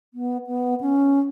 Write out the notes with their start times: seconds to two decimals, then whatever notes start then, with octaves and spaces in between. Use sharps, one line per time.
0.14 B3
0.47 B3
0.81 C#4